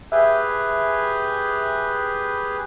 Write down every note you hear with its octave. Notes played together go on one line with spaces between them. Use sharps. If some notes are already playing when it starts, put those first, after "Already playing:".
G4 G#4 B4 E5